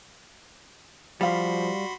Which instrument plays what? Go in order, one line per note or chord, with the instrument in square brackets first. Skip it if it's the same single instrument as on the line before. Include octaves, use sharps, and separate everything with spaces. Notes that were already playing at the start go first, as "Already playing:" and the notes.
[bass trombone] F3 [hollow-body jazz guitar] G3 F5 [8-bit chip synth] F#4 B5 C6